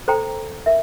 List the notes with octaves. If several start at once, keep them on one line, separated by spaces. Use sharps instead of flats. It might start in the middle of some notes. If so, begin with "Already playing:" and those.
A4 C5 G5 A#5
A#4 E5